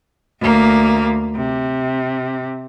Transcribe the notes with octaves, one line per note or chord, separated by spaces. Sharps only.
D2 A#3
C3